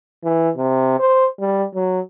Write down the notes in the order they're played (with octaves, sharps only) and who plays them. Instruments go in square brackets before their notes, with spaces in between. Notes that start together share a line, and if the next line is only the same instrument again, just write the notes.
[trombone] E3
C3
C5
G3
F#3